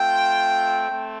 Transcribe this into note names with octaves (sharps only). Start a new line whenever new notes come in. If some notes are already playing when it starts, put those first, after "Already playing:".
Already playing: A3 C4 F4 G5
A3 C4